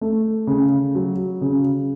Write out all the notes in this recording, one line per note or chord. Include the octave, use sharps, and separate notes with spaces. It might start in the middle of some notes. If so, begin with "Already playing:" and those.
A3
C#3
F#3
C#3